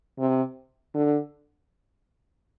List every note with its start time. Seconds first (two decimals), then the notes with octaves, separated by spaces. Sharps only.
0.19 C3
0.94 D3